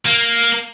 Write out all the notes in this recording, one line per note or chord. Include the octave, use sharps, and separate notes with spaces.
A#3